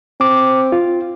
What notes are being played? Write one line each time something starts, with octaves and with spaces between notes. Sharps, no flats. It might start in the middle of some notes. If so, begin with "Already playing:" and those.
C4 D6
F4